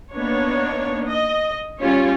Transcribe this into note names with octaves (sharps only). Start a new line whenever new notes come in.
A#3 B3 D4 D#4 C#5
D#5
G3 C#4 F4 G4 C#5